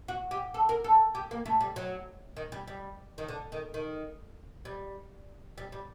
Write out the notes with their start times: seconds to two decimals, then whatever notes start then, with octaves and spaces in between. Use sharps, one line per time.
0.08 F#4
0.31 G4
0.54 A4
0.69 A#4
0.84 A4
1.15 G4
1.31 A#3
1.46 A3
1.61 G3
1.76 F#3
2.37 D#3
2.52 G3
2.68 G3
3.18 D#3
3.28 D3
3.52 D#3
3.74 D#3
4.65 G3
5.57 G3
5.72 G3